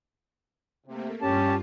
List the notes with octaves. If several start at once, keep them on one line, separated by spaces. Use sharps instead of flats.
C3 A3 A#3
G2 G3 C#4 F4 G4 A5